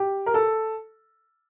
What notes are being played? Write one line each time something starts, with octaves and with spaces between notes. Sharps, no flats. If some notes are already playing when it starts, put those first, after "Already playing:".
Already playing: G4
A#4
A4